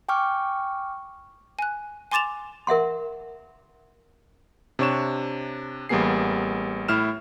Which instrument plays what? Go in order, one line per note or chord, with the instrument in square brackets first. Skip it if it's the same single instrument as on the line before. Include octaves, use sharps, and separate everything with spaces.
[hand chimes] G5 G#5 C#6 D6 F6
[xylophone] G#5 F#6
G#5 C6 D6 A6 E7 F7
[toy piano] A#4 E5 F#5 C6
[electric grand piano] C3 D4 C#5 C#6 E7
A1 G3 A#3 B3 G#4 C7
A2 E4 F6 E7